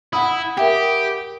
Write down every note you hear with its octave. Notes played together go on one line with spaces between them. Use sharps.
E4 F#5 B5 D#6
G4 A#4 E5 G5